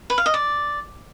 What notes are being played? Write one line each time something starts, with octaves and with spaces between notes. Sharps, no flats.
B4
F5
D#5
D5